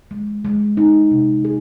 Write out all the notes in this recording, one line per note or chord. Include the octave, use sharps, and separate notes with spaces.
G#3
G#3
D#4
C3
G#4